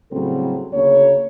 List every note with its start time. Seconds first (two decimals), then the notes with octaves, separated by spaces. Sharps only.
0.12 A2 C#3 F#3 G3 C4 A4
0.73 D2 C#3 A#3 C#5